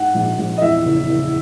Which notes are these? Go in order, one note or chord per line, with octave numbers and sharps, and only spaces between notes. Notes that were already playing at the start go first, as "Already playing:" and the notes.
Already playing: G#2 F#5
A#1
A#1
D#5
E2 E5
F#1
F#1